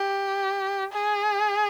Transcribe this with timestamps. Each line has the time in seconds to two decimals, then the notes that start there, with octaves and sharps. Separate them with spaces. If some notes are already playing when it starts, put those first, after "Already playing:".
Already playing: G4
0.93 G#4